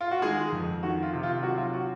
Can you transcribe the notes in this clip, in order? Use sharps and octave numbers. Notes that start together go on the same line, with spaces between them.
F4
F#4
D#3 G#3 G#4
F2
D#3 F#4
F4
C3
F4
F#3 F#4
F4
F#4